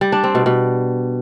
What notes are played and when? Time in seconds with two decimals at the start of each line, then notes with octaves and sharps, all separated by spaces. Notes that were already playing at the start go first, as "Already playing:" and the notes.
0.01 G3
0.12 D4
0.24 C4
0.35 B2
0.46 B2